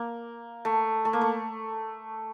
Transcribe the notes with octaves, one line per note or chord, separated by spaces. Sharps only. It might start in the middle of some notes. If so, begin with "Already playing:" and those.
Already playing: A#3
A3
A3
A#3
A3